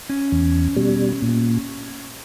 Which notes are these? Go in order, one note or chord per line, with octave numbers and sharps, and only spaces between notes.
C#4
E2
B2 G3
A#2